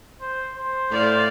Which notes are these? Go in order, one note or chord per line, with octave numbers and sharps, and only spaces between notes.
C5
C5
A2 D5 F5